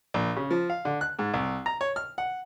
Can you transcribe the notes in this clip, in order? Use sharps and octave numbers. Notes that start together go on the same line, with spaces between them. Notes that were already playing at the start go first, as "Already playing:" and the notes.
A#1
C#3
F3
F5
D3
F#6
G#2
C2
A#5
C#5
F6
F#5